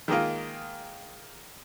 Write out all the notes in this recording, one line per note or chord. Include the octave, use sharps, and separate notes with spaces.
D#3 G#3 A#3 F4